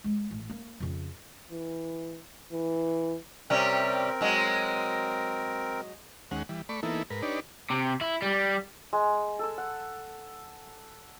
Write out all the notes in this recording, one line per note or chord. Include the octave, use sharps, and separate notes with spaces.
G#3
A1
A#3
F2 C#3
E3
E3
C3 G3 C4 C#4 A#4
F#3 G#3
D#2 G#3 C#4 F#5
E3 G3
A3 D5 B5 C#6
E3 A#3 B3 D#4 E4 A4
G#2 A#4 B4
D4 D#4 G4 B4 C#5 D5
C3
E4
G3
G#3
A4 E6
F#5